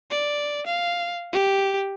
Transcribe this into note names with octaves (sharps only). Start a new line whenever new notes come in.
D5
F5
G4